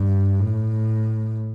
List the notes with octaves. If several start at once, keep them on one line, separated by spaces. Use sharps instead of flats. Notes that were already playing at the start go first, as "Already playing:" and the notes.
Already playing: G2
A2